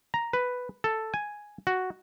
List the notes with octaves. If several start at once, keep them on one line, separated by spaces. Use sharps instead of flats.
A#5
B4
A4
G#5
F#4